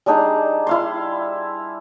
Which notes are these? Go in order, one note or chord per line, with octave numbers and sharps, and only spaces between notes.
G3 D4 D#4 G#4
E4 F5 C6